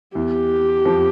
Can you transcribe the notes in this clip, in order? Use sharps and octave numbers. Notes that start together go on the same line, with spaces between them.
E2 E3 G4
F2 F3